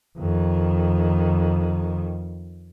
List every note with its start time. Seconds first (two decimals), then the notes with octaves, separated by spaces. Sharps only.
0.18 F2 D#3